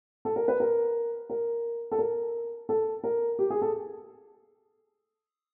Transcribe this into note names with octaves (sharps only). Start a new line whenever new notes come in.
A4
A#4
B4
A#4
A#4
A4
A#4
A4
A#4
G4
G#4
A4